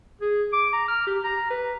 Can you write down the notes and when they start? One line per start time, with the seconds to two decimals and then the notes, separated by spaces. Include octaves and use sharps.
0.21 G#4
0.53 D6
0.73 A#5
0.88 F6
1.07 G4
1.24 A#5
1.50 B4